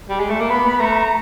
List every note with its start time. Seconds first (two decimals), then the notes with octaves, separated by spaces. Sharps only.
0.09 G3
0.20 G#3
0.30 A3
0.40 A#3
0.50 B3 B5
0.80 A3 A#5